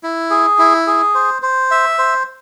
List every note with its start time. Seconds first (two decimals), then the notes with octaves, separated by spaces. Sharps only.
0.03 E4
0.30 G#4
0.59 E4
0.87 G#4
1.15 C5
1.42 C5
1.71 E5
1.98 C5